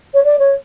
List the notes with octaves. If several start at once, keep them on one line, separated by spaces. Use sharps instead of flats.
C#5
D5
C#5